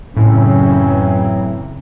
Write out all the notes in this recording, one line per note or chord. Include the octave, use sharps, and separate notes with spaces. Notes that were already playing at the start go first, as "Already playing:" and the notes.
F#2 A2 C#3 E3 F#3 C4 C#4